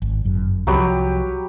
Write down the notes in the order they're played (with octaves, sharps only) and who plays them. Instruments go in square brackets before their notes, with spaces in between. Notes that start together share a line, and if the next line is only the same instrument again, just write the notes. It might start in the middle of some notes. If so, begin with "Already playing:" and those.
[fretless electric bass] G#1
G1 F#2
[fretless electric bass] C2 F3 [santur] F#3 G4 B4